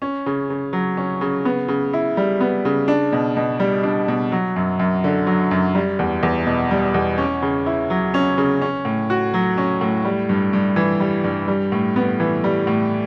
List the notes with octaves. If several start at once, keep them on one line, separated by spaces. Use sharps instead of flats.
C#4
C#3
C#3
F#3
C#4
C#3
B3
C#3
E4
G3
B3
C#3
D4
B2
B2
G3
D4
B2
F#3
F#2
F#2
D3
F#3
F#2
G3
E2
E2
B2
G3
E2
C#4
C#3
E4
F#3
C#4
C#3
C#4
A2
F#4
F#3
C#4
A2
G3
G2
G2
E3
G3
G2
G3
A2
B3
E3
G3
A2